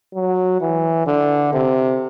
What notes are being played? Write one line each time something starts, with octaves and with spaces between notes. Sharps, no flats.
F#3
E3
D3
C3